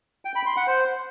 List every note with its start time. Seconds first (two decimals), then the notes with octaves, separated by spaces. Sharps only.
0.25 G5
0.35 B5
0.46 C6
0.57 F#5
0.67 C5